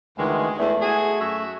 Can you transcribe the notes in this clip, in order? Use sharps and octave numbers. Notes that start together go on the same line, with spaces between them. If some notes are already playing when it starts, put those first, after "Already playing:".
D2 D#3 E3 G#3
E2 A3
F#4 G#4
F#2 F#4 E5